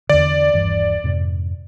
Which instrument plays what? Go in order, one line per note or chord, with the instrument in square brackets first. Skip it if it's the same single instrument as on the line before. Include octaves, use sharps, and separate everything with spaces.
[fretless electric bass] E2 D3 [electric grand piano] D5
[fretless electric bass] D#1 G2 E3
F2 G#2 C3